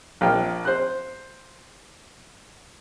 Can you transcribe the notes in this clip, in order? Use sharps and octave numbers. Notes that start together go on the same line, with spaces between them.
A#1 F3 G5 F6
C5 F#6